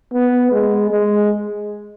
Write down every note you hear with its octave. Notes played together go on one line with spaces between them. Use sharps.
B3
G#3
G#3